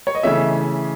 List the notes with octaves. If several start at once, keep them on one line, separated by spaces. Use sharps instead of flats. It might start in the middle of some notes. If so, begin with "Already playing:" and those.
C#5
D#5
C#3 E3 A3 C#4 E5